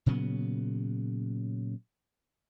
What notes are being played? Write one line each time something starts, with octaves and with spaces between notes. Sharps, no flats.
A#2 C#3 F#3 B3